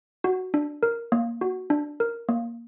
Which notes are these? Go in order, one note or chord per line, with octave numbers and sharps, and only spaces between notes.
F#4
D4
A#4
A#3
F#4
D4
A#4
A#3